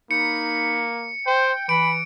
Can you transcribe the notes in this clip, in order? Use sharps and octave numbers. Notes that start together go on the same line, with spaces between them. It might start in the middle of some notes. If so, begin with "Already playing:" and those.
A#3 D#4 B5 C#7
C5 G5
E3 B5 D7